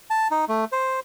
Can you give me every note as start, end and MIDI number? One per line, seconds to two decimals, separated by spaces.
0.10 0.28 81
0.31 0.45 63
0.49 0.65 57
0.72 1.00 72